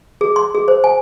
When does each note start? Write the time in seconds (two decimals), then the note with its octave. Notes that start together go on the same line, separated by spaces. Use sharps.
0.21 G#4
0.36 C6
0.55 G#4
0.68 C5
0.84 G#5